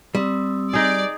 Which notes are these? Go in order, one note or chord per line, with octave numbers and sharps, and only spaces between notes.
G3 C4 D#6 E6
D#4 G#4 D5